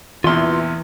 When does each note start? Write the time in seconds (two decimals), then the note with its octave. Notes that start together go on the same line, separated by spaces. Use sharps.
0.24 A#1 E2 C3 E3 F4 C6